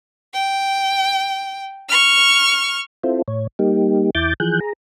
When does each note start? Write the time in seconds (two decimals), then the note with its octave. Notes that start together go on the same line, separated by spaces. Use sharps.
0.34 G5
1.89 C#6 F6
3.04 C4 E4 F4 A4 C5
3.28 A2 C#5
3.59 G3 A#3 D#4 G4
4.15 E2 E4 D6 G6 A6
4.40 E3 F3 G#4 F#6 G6
4.60 G#4 A#5